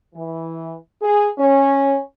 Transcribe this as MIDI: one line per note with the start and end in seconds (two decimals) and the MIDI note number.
0.15 0.74 52
1.02 1.26 68
1.38 1.96 61